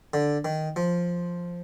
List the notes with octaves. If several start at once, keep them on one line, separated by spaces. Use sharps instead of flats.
D3
D#3
F3